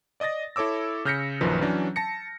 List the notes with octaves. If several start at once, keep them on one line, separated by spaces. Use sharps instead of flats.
D5 D#5 D#6 A6 A#6
E4 A4 C#5 D6 E6
C#3 F6 G6 A#6 B6 C#7
A#1 F#2 D#3 F3 B4
E3 F#3 C#4 D4
A5 A#6 C#7